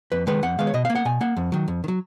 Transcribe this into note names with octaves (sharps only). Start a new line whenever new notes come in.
F2 B4
D#3 G#3 B3 B4
F2 F#5
D#3 G#3 B3 F5
C#5
B2 D#5
A#3 F5
F#5
B2 G#5
A#3 F#5
F2
D#3 F#3
F2
D#3
F#3